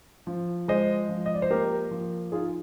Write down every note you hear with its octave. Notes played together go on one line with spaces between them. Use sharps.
F3
G#3 C5 D#5
F3
D#5
D5
C5
A#3 G4 A#4
F3
D#4 F4 G#4